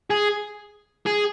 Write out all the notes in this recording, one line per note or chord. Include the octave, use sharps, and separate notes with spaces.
G#4
G#4